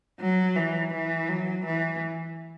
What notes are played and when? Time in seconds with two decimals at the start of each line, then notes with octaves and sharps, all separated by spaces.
0.20 F#3
0.56 E3
0.93 E3
1.29 F#3
1.66 E3